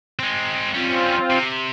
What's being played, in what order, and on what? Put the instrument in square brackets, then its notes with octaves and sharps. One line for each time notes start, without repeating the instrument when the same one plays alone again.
[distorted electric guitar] G#3 C4
[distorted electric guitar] G3 C#4 [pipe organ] C4 F4
[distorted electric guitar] C3